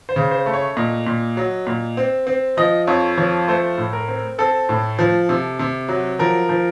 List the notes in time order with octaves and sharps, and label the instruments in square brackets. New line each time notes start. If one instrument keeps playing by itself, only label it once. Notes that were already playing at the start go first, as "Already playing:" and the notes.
[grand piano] C5
C#3
C5
A3
C#5
A#2 D#5
A#2
F#3
A#2
C4
C4
F3 D#5
F2 C#5
F3 C#5
A3 C5
A2
A#4
C4
C4 A4
A2
F3
C3
C3
F#3
F3 A#4
F3